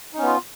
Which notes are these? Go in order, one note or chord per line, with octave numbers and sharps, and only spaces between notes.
B3 C#4 D#4 F4